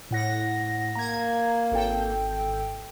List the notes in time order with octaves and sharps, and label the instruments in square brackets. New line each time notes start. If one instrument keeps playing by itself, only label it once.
[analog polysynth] A2 F#5 A#6
[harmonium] A#3 [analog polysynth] A#5 G#6
[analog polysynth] G#1 A4 G5